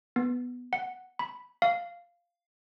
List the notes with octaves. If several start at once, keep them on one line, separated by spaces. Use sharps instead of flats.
B3
F#5
B5
F5